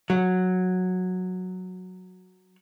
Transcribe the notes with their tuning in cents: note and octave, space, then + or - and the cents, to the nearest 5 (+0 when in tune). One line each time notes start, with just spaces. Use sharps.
F#3 -10